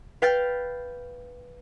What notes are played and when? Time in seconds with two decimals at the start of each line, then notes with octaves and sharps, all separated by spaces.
0.22 B4 F5 G5 F6 G6 A6